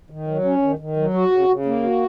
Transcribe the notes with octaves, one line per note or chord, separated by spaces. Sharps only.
D#3
F#3
C#4
D#3
D#3
F#3
F#4
C#3
C#3
A#3
F#4